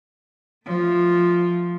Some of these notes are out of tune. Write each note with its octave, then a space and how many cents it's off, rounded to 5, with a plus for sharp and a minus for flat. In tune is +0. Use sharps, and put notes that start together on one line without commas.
F3 +0 A3 +0